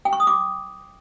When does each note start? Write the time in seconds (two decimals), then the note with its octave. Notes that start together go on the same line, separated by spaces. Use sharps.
0.05 G5
0.13 C#6
0.20 D#6
0.27 D6